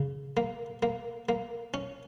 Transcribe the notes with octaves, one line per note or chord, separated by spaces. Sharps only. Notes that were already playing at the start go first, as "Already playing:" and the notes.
Already playing: C#3
A#3
A#3
A#3
C#4